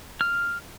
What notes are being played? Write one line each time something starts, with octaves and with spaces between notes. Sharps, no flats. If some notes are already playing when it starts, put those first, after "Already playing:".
F6